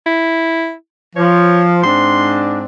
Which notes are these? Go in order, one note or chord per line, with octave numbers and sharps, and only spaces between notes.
E4
F3 C#5
G#2 C4 D4 C6